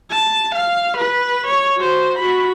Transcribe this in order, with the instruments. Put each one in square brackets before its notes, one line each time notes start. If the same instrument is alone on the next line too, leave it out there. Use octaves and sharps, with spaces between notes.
[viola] A5
F5
B4
C#5
F#4 C5
F#4 B5